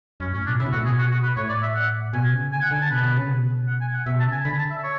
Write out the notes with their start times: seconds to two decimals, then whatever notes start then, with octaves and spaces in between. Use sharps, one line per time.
0.20 F#2 C#4
0.33 A2 C#4
0.46 B2 D4
0.59 C#3 E4
0.66 B2
0.72 A2 F#4
0.82 B2 G#4
0.98 F#4
1.11 F#4
1.23 B4
1.37 A2 C#5
1.49 D5
1.62 E5
1.75 F#5
2.13 B2 G#5
2.33 C#3
2.52 D3 G#5
2.62 F#5
2.71 D3 G#5
2.81 A5
2.91 B2 B4
3.03 B2
3.16 C#3
3.30 B2
3.68 F#5
3.81 G#5
3.94 F#5
4.06 B2 E5
4.20 A5
4.26 C#3
4.32 G#5
4.45 D3 B5
4.58 A5
4.71 E5
4.83 C#5